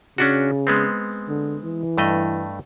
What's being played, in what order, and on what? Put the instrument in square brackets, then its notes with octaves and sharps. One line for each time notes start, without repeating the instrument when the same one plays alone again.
[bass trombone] C#3 [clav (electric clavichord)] C#4 D4 F#4
[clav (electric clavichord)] G#3 B3 C4
[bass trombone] D3
E3
[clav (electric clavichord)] G2 A3 D#5